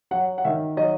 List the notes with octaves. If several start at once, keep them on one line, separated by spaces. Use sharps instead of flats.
F#3 F#5
F#5
D#3 E5
F#3 D#5